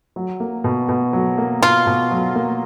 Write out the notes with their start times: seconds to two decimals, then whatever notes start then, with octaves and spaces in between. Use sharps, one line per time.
0.16 F#3
0.40 A#3
0.64 B2
0.89 B2
1.13 F#3
1.38 A#3
1.62 B2 F4
1.87 B2
2.11 F#3
2.35 A#3